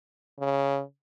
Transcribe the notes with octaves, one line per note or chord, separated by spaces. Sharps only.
C#3